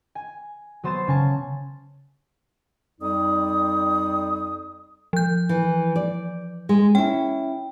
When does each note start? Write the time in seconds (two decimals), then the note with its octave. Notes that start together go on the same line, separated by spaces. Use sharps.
0.15 G#5
0.83 F#3 B3 C5 C6 A6 E7
1.08 C#3 G#5 A5
3.01 F2 G3 D#4 D5 D#6
5.13 F3 G6
5.49 E3
5.96 D5
6.69 G#3
6.95 C#4 E4 G5